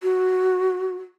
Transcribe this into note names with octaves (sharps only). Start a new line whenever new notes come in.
F#4